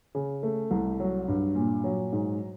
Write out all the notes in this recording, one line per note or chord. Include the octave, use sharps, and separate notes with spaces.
C#3
A3
C2
F#3
G2
A#2
F#3
G#2